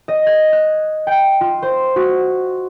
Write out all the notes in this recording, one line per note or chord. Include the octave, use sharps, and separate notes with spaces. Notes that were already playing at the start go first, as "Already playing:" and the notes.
D#5
G#6
F#6
G5
F4
C5
F#4